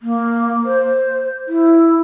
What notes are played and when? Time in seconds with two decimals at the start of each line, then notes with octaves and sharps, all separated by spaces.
0.01 A#3
0.65 C5
1.48 E4